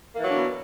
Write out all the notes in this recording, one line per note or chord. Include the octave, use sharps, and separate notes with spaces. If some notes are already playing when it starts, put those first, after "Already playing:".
B2 E3 F#3 A#3 D4